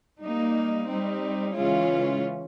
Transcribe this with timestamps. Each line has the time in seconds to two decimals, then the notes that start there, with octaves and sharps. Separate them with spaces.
0.22 G3 A#3 D#4
0.89 G3 C4 D#4
1.55 C#3 E3 G#3 C#4 F4